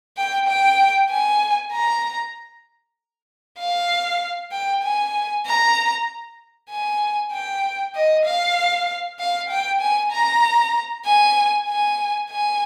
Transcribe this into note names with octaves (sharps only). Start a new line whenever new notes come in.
G5
G5
G#5
A#5
F5
G5
G#5
A#5
G#5
G5
D#5
F5
F5
G5
G#5
A#5
G#5
G#5
G#5